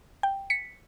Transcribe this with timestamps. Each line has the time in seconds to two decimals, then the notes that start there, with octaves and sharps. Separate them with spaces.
0.23 G5
0.50 B6 C#7